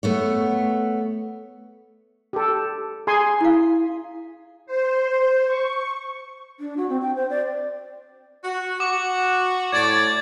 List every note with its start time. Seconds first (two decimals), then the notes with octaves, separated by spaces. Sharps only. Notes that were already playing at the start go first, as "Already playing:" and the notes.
0.03 A3 B3 C#5
2.33 G4 A4
3.07 G#4 G#5 C6
3.41 E4 F5
4.66 C5
5.46 C#6
6.59 D4
6.77 F#4
6.89 C4
7.02 G5
7.16 C5
7.30 D5
8.44 F#4
8.80 F#4 D6
9.72 A2 D5 G#6 A6